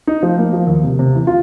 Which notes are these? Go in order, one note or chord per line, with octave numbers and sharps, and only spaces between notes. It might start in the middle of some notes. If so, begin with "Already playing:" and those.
D#4
F3
A#3
F3
D#2
C3
C3
E3
F4